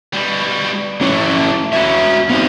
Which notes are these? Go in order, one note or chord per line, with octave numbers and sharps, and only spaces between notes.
B2 G3
F#3 A3 C#4 E4 C#5
B2 C#4 F#4 E5
B3 C4 D#4 D#5 F5